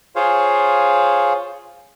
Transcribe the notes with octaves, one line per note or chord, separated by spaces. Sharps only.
F4 G#4 C5 C#5 F5